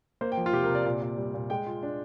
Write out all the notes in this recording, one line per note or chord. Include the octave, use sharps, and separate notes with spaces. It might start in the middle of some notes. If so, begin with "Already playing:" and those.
A#3 C5
G5
F3
F4
C3 G4
A#4
C3
D5
A#2 D5
A#2
G3
A#2
G#3 G5
F4
D4